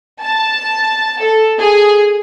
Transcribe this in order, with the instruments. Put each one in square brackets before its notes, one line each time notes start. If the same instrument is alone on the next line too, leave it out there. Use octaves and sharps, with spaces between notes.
[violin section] A5
A4
G#4